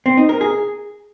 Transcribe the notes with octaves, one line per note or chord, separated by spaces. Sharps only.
C4
D#4
A#4
G#4